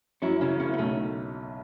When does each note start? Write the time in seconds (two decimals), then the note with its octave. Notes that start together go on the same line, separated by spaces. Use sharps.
0.22 F#2 C#4 E4
0.41 C#3 C#4 E4
0.60 F#1 C#4 E4
0.74 B3
0.78 B1 A3 C#4